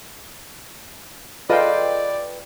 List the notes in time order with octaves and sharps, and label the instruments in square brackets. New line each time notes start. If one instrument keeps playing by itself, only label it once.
[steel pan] F4 G#4 F5 [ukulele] A4 D#5 [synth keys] B4 G5 [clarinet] D5